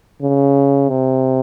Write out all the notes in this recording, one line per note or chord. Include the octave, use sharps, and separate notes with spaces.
C#3
C3